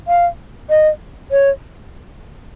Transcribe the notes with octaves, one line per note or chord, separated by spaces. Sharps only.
F5
D#5
C#5